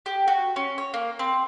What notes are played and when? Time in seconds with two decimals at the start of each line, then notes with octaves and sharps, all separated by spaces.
0.06 G4
0.28 F#4
0.56 C#4
0.78 C#5
0.94 A#3
1.19 C4